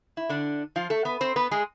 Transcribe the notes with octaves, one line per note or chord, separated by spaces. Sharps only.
E4
D3 D4
F3 F4
A3 A4
B3 B4
C4 C5
B3 B4
G#3 G#4